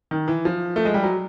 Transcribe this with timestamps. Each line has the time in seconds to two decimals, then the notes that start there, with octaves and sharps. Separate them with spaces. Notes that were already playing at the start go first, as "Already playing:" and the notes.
0.11 D#3
0.28 E3
0.45 F3
0.76 A3
0.85 G#3
0.94 G3
1.03 F#3